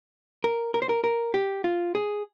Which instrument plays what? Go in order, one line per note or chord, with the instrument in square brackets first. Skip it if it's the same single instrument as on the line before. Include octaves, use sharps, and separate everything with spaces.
[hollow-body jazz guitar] A#4
A#4
C5
A#4
A#4
G4
F4
G#4